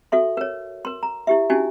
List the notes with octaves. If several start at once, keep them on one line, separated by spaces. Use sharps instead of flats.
F#4 A4 E5 C6
A#4 C#5
A#4 C6
A#5
E4 G4 E5
C#4 D#4 E4 F#4 G4 G#5